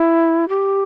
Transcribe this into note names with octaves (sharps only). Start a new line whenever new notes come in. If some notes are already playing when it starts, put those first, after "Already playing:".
Already playing: E4
G4